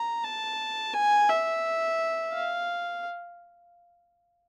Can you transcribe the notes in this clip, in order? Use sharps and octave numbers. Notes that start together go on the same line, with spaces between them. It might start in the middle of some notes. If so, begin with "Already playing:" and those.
Already playing: A#5
A5
G#5
E5
F5